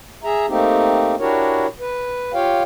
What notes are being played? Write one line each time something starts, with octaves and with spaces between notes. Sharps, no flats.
G#4 E5 A#5
A3 A#3 C4 D#4 G4
D4 E4 F#4 G4 A#4 C#5
B4
F4 G4 C#5 F5 G5